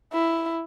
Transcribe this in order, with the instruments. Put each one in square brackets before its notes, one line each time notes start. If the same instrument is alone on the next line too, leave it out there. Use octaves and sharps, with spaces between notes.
[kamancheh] E4